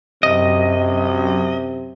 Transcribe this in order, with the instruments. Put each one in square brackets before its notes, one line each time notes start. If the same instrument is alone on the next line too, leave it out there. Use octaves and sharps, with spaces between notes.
[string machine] F#2 [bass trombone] C3 [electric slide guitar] D#5